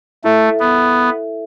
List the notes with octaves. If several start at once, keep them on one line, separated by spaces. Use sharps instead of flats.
A3 E4 A4 E5
B3